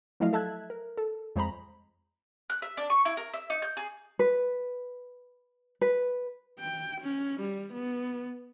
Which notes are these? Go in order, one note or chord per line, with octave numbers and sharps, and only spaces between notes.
F3 F#3 A3 E4 D#5 F5
A4 E5 A5 E6 F#6 G#6
A#4
A4
F2 G#3 C5 A#5 B5
F#6
E5
D4
C#6
E4
A#4
E5
D#4
G6
G#4
B4
B4
G5
C#4
G3
B3